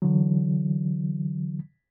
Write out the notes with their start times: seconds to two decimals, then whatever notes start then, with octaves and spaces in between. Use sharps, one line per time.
0.02 D3 E3 F#3